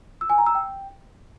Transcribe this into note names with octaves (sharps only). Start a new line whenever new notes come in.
E6
G#5
A#5
E6
G5